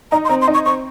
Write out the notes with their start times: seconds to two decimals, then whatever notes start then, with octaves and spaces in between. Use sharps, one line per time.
0.12 D#4 A#5
0.25 C6
0.29 C4 A#5
0.41 C6
0.48 D#4
0.54 C#6
0.66 C4 C#6